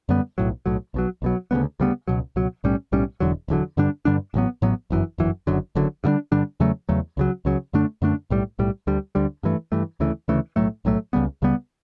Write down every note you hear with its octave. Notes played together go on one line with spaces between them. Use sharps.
F#2 D3 G3 B3
B1 A2 F#3
B1 A2 F#3
B1 B2 F#3
B1 B2 F#3
D2 C#3 G3 B3
D2 C#3 G3 B3
C#2 B2 F#3
C#2 B2 F#3
B1 A2 G3 C#4
B1 A2 G3 C#4
E1 E2 D3 F#3
E1 E2 D3 F#3
G2 D3 G3 D4
G2 D3 G3 D4
A1 A2 F#3 B3
A1 A2 F#3 B3
G1 F#2 E3
G1 F#2 E3
F#1 F#2 D3 F#3
F#1 F#2 D3 F#3
G2 D3 G3 D4
G2 D3 G3 D4
E2 C#3 F#3 A3
E2 C#3 F#3 A3
C#2 C#3 F#3
C#2 C#3 F#3
F#2 D3 A3 D4
F#2 D3 A3 D4
B1 A2 G3
B1 A2 G3
D2 D3 G3
D2 D3 G3
G2 E3 A3
G2 E3 A3
D2 C#3 E3 A3
D2 C#3 E3 A3
B1 A2 F#3 A3
B1 A2 F#3 A3
C#2 C#3 G3 B3
C#2 C#3 G3 B3